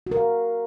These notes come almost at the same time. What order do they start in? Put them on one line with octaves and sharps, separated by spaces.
F#4 A#4 F5